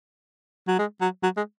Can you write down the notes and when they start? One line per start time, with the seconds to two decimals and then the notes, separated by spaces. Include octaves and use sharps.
0.67 F#3
0.79 G#3
1.01 F#3
1.23 F#3
1.37 G#3